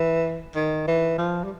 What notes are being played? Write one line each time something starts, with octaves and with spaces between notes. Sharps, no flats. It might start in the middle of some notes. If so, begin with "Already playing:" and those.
Already playing: E3
D#3
E3
F3
G3